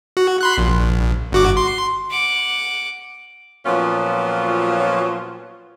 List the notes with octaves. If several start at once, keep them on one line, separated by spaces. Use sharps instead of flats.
F#4
B5 C6 F#6
A#1
G1 F#4 D6
C6
F#5 D6
A#2 F3 F#3 B3 C#4 F4